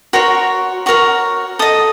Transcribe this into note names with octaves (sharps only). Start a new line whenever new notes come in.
F#4 A#4 C#5 C6
F#4 A#4 C#5 C#6
A4 D#5 D#6